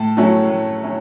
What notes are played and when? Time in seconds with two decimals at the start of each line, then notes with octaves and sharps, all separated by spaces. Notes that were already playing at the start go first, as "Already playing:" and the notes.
Already playing: A2 A5
0.17 F#3 A3 C#4 E4
0.50 A2
0.83 C#4 E4